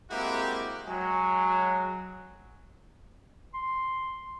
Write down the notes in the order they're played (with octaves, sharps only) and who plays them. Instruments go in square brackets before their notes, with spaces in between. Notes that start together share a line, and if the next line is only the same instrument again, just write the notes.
[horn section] G#3 A#3 C4 E4 F#4 G4
F#3 G#3
[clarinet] C6